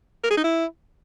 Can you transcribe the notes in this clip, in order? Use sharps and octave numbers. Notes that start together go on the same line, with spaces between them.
A#4
G#4
D#4
E4